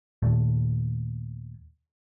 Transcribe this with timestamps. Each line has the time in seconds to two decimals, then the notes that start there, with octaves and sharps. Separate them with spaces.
0.22 D#2 A#2 A3